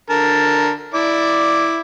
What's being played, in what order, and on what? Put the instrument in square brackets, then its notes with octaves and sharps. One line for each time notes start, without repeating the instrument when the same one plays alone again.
[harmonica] D3 A#4 A5
E4 D5 D6